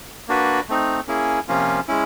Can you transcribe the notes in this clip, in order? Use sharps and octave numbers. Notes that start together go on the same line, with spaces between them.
A#3 D4 F#4 B4
A3 C4 D#4
A#3 C#4 E4 G#4
C3 F3 A#3 C#4 F4
G#3 C#4 E4